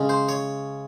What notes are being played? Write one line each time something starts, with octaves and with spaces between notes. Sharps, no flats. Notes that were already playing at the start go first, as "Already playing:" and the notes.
Already playing: C#3 G#3 C#4
C5
C#5